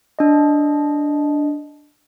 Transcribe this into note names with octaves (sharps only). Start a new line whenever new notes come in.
D4 D#5